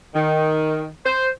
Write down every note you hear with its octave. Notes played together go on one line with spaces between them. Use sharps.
D#3
C5